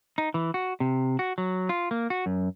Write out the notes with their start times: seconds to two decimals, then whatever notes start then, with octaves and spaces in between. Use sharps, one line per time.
0.18 D#4
0.34 E3
0.54 F#4
0.80 C3
1.19 F#4
1.38 F#3
1.69 F4
1.91 A#3
2.10 F#4
2.26 F#2